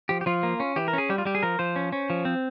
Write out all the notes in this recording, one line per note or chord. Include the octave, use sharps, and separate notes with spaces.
F3 G4
G4
F3 F4
A#3
C#4
E3 G4
A#4
C#4 G#4
G3 G4
F4
G3 G4
G#4
F3 A#4
F3 C5
C#4
C#4
F3
C4